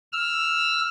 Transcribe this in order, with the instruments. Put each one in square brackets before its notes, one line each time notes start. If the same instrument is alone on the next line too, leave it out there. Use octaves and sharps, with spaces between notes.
[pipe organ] E6 F6